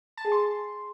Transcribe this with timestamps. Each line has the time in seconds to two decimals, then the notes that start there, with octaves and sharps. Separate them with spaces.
0.17 A5
0.25 G#4
0.32 C6